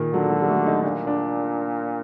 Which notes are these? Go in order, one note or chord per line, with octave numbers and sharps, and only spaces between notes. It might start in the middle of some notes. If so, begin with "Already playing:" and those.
Already playing: A#2 D#3
D3 F#3
F#3
G3
A3
D#4
A#2 D4
D4